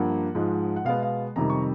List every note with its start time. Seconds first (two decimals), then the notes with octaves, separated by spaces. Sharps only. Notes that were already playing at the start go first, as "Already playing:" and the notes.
Already playing: G2 F3 A#3 F#5
0.35 G#2 F3 G#3
0.76 F#5
0.85 B2 G#3 B3 F5
1.03 F5
1.36 F2 C3 D#3 G3 A#5
1.50 C#6